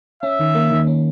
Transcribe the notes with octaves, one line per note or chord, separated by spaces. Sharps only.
C#4 E5
D#3
A#3
D#3
C#4